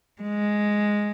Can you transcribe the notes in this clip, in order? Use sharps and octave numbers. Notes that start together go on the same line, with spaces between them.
G#3